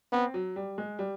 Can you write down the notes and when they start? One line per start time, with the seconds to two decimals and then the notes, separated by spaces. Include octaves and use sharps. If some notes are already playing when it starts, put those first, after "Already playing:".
0.12 B3 C4
0.34 F#3
0.56 G3
0.78 G#3
0.99 G3